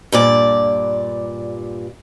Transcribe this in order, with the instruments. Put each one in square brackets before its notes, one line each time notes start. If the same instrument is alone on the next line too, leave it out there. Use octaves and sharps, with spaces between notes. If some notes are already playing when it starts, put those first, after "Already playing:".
[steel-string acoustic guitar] G2 A#2 D5